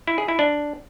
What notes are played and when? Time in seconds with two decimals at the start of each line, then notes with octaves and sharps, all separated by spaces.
0.07 E4
0.18 G#4
0.28 E4
0.39 D4